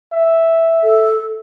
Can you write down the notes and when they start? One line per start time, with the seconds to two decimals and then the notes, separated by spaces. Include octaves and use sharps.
0.14 E5
0.83 A4